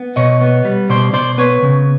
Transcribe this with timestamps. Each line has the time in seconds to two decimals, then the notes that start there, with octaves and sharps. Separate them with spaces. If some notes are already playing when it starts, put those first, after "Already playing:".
Already playing: B3
0.16 B2 C#5 D#5
0.41 B3
0.65 G3
0.89 B2 C5 D5
1.13 B2 C5 D5
1.38 B3 B4 C#5
1.62 C#3